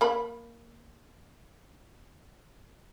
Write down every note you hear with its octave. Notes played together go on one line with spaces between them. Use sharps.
A#3 B5